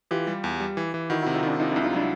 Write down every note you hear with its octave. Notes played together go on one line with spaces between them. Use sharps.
E3 F4 G4
G3
E2
G3
E3
E3
D#3 E4 F#4
C3 E4 F#4
D#4 F4
D#3 D4 E4
C3 D#4 F4
C2 D4 E4
D#4 F4
F#3 D4 E4